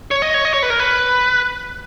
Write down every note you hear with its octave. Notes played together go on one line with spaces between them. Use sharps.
C#5
D#5
C#5
D#5
C#5
B4
A#4
B4